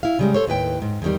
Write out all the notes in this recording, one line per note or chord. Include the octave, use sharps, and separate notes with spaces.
E4 F5
C#3 G3 G#3
A4 C5 C#5
D#2 A2 B4 G5
G#2
E2 D#3 G3